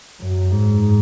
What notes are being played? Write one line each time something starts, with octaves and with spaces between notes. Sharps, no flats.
F#2
G#2